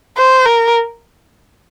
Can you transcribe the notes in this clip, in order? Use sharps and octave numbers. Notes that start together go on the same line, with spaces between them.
C5
A#4